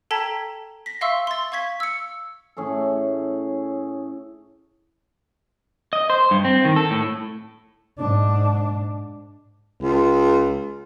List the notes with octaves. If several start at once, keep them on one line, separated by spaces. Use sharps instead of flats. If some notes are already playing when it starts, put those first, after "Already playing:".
A4 G5 A5 A#5 G#6 B6
A#6 B6
E5 F5 C6 C#6 E6
C6 A6
F5 C#6 G#6 B6
E6 C#7
A2 C#4 G#4 A4
D#5
C5
G2
C4
D#3
A4
A2
G#2 D4
C#2